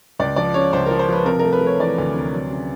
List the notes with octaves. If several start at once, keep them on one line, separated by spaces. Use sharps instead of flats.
C#2 D5
F3 D5
C#3 C#5
C#2 C5
A#4
F3
C5
F3 B4
C3 A#4
A#4
A3
B4
A3
C#5
E3 D5
D2
C3
F#3
C#3